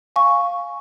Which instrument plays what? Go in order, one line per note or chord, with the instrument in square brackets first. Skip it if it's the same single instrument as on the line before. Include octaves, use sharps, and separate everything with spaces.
[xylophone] F5 G#5 C#6